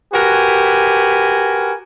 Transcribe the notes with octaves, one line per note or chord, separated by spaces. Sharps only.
F#4 G4 A#4 B4 G#5